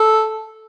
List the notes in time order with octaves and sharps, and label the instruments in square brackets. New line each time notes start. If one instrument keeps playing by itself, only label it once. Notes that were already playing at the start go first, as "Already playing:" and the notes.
Already playing: [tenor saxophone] A4